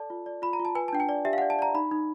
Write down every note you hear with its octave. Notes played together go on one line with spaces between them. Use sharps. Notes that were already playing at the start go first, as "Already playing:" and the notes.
Already playing: A4 D5 A5
F4
D5
F4 B5
A#5
F4
A5
B4 G#5
A5
D4 G5
G#5
D5
G4 E5
F5
F#5
D5
A5
D5 A#5
D#4 B5
D#4